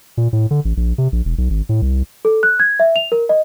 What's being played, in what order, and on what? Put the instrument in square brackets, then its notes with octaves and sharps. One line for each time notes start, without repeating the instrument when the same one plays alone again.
[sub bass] A#2
A2
D3
A1
A#1
C3
A#1
E1
B1
G#1
A2
C2
[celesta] A4
F#6
G#6
E5
F7
A#4
D#5